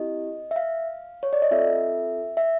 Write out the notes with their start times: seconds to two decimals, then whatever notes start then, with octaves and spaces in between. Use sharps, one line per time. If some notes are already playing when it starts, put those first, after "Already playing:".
Already playing: C4 E4 G4 D#5
0.51 E5
0.56 F5
1.23 C#5
1.33 D5
1.42 D#5
1.51 C4 F4 A4 E5
2.37 E5